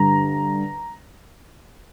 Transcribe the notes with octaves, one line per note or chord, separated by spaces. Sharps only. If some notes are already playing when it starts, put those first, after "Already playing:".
Already playing: G2 D3 G3 A#5